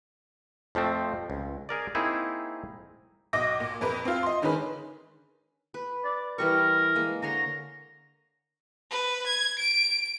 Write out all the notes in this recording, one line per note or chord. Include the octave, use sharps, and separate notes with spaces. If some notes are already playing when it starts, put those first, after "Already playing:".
F2 F3 A3 C4
C#2
G#4 A#4 D5
A#3 C4 D#4 E4 G#4
B1 D#5 D6 A#6
A#2
F2 A#4 B4
C4 F4
D#5 C6
D3 D#3 G#3 C#4 B4
B4
D5
E3 G3 A#4 C#6
G#3 A#3
D3 C#5 A#5 C6
B4
G#6
D7